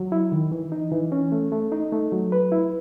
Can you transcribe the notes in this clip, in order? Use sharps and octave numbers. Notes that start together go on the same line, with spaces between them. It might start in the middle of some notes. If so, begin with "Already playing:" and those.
Already playing: F#3
E4
D#3
E3
D#4
E3
C#4
A3
A3
D#4
A3
F#3
B4
E4